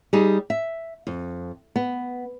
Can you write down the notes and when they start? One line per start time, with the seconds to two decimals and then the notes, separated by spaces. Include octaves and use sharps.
0.13 G3 D#4 G4 G#4
0.50 E5
1.07 F2
1.76 B3